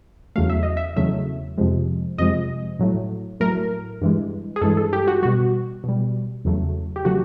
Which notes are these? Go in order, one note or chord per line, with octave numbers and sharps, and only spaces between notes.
E2 C#3 F#3 A3 F5
E5
D#5
E5
E2 C#3 F#3 A3 E5
F2 C3 F3 G#3
F2 C3 F3 G#3 D#5
A2 F#3 A3
A2 F#3 A3 A#4
G2 E3 G#3
G#4
G2 E3 G#3 A4
A4
G4
F#4
B2 G3 F#4
B2 G3
E2 C#3 F#3 A3
G4
C#3 F#3 A3 F#4